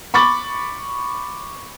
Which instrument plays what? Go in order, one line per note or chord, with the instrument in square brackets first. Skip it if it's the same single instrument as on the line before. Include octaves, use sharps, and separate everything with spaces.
[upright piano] B5 C#6 D6 A6 F#7